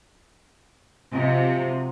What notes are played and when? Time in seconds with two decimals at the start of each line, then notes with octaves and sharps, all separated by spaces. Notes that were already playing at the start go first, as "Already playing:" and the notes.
1.12 C3 F3 F#3 G#3